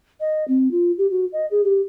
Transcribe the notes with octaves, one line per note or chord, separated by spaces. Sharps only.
D#5
C4
F4
G4
F#4
D#5
G#4
G4